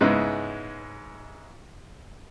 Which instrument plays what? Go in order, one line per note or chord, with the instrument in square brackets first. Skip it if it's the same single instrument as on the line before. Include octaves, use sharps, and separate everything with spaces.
[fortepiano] G#2 C#3 G#3 B3 E4